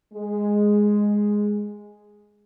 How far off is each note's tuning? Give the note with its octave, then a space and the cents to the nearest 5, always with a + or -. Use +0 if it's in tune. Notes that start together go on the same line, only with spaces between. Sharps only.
G#3 -5